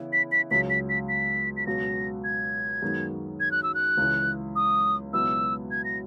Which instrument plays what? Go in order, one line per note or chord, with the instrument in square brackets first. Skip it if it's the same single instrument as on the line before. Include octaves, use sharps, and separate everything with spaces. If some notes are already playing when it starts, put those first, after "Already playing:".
Already playing: [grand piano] C#3 E3 B3 E4
[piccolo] B6
B6
[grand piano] C#2 C#3 F#3 [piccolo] B6
[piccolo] B6
B6
B6
B6
[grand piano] C#2 B2 F#3 [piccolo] A#6
[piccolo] G#6
[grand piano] F#2 D#3 G#3 B3
[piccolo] G#6
F#6
E6
F#6
[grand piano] C#2 C#3 E3
[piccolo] D#6
[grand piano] C#2 B2 F#3 B3 E4 [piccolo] E6
[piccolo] G#6
A#6